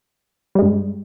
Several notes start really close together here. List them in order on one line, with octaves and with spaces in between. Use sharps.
G3 G#3 G2